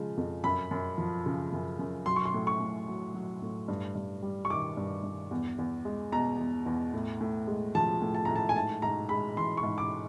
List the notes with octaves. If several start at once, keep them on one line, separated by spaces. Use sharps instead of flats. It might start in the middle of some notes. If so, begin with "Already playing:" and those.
Already playing: C#3 F3 G#3
F2
F#2 B5
F#2
F3
C#3
F#2
F#2
F#3 C6
C#6
C6
A2
C#6
A2
F#3
F#3
A2
G2
G2
G3
C#6
D#3 D6
G2
G2
E2
E2
G#3
B2 A#5
E2
E2
A2
A2
G#3
F3 A5
A2
A5
A2 A#5
A5
G#5
G#2 A5
G#2 A#5
G#3 B5
E3 C6
C#6
G#2
D6